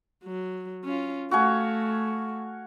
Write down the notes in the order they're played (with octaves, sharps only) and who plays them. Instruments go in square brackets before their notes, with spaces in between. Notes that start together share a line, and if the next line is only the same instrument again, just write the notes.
[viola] F#3
C#4 F4
[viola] A3 [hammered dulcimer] F#4 F5 G#5